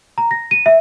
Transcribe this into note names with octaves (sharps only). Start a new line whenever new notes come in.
A#5
A#6
D#7
E5